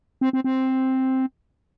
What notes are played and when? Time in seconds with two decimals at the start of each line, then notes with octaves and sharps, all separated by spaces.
0.21 C4
0.33 C4
0.44 C4